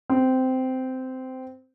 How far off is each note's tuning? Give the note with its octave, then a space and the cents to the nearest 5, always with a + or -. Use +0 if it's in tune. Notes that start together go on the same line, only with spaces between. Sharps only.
C4 -15